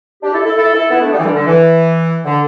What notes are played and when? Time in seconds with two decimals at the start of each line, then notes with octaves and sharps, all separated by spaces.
0.23 D4 G4
0.35 E4 A4
0.46 E4 A4
0.57 E4 A4
0.74 E4 A4
0.91 B3 E4
1.02 A3 D4
1.12 G3 B3
1.19 E3
1.24 D3 G3
1.35 D3
1.47 E3
2.25 D3